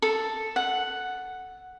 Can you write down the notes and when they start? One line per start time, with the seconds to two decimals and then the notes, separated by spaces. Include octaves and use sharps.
0.02 A4
0.56 F#5